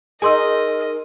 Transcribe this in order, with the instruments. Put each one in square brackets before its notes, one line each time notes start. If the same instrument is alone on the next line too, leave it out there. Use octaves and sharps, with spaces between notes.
[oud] D#4 G#4 [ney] A#4 [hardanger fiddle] D#5 [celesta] G#5 C6 E6